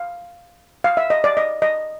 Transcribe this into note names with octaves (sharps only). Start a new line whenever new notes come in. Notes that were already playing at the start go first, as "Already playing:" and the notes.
Already playing: F5
F5
E5
D#5
D5
D#5
D#5